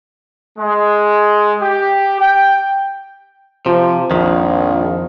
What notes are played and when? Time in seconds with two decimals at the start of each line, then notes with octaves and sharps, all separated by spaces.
0.58 G#3
1.62 G4
2.20 G5
3.66 C3 F3
4.11 A#1 F2 D#3